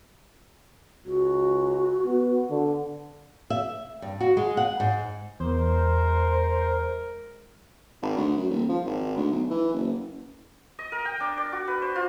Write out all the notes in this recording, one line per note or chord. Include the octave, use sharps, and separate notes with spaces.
C#2 F#4
B3
D3
E5
G2
F#4
G#3
F#5
G#2
E2 G#3 A#4 C5
G#1
D2
F#2
D#1
F3
G#1
D2
B1
E3
F#1
D#5
A#4
G5
D4
D5
F#4
B4
C5
F4